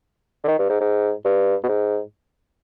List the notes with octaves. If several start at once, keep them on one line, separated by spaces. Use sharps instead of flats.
D3
D#3
G2
G#2
G#2
G2
B2
G#2